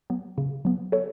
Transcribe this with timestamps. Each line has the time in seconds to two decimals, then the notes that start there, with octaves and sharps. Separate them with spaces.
0.10 F#3 B3
0.38 C#3
0.65 F#3 B3
0.92 A4 C#5